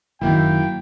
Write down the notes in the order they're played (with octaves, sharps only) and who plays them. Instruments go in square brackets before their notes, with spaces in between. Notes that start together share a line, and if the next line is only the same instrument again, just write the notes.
[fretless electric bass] F#1 D#3 [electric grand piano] F#3 A#3 E4 [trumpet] G5